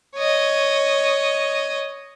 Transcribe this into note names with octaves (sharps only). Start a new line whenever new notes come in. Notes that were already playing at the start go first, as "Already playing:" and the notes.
C#5 D#5